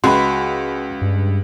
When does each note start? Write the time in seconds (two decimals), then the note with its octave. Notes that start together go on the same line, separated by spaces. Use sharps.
0.04 C#2 F#4 B4 B5 C6
1.02 G2